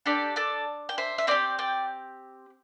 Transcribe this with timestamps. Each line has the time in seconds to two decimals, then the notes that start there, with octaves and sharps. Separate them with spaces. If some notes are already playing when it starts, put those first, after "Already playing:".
0.06 D4 G4 A4 D5
0.36 A4 D5
0.89 G5
0.98 C5 E5
1.18 E5
1.27 C4 G4 D5 G5
1.59 D5 G5